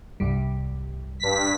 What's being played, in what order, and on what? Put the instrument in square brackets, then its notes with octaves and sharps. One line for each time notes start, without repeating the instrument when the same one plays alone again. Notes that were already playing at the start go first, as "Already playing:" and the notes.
[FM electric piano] C2 G2 G3
[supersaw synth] G2 B6